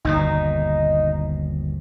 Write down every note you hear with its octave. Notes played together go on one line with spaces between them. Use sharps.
G1 D#2 B2 D#4